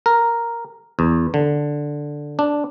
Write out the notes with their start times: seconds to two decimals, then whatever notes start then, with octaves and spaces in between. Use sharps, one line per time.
0.06 A#4
0.99 E2
1.34 D3
2.39 D4